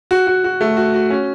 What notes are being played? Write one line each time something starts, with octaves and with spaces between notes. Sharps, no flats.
F#4
F#4
F#4
A3
F#4
F#4
C#4